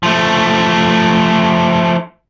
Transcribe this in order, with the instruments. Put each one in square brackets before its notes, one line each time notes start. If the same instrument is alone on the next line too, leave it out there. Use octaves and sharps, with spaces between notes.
[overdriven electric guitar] F3 A3